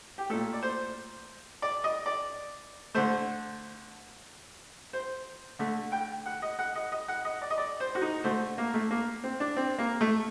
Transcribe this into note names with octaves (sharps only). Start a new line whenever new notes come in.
G4
A#2 A3 A4
D5
C5
D5
D#5
D5
D3 A3 C5
C5
D3 A3
G5
F#5
D#5
F#5
D#5
D#5
F#5
D#5
D5
D#5
D5
C5
F#4
D#4
D3 A3 C5
A#3
A3
A#3
C4
D4
C4
A#3
A3